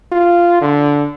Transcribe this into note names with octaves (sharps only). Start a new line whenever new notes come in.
F4
D3